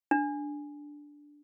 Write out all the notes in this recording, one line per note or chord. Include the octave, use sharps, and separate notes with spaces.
D4